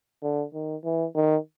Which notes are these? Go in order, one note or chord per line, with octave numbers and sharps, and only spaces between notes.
D3
D#3
E3
D#3